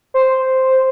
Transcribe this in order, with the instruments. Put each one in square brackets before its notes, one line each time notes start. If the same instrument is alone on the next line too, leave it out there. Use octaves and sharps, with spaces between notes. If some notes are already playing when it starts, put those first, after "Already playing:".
[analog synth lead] C5